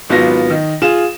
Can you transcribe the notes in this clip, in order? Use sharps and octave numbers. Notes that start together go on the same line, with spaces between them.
G#1 F#3 B3 F4 A#6
D#3
F4 G#4 E7